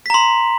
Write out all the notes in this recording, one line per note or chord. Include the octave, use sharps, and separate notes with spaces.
A#5 C6 B6